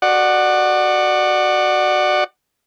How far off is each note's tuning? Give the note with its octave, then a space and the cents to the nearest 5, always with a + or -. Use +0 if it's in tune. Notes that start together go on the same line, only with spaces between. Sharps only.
F#4 +0 D5 +30 F#5 +0